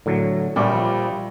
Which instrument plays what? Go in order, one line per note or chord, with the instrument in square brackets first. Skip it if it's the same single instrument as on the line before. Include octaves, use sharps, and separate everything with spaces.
[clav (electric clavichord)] A2 D3 F#3
[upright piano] A#1 G3 [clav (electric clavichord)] G4 C#5 D5
[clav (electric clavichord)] F3